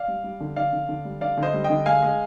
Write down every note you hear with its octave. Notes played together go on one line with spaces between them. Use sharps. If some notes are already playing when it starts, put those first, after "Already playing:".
Already playing: D5 F5
G3
G3
D3
D3 D5 F5
D3
D3
G3
D3 D5 F5
D3
C5 D#5
G3
D#5 G5
D3
G#3 F5 G#5
G#3